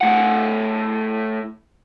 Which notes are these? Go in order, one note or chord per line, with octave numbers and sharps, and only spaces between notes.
A2 F#5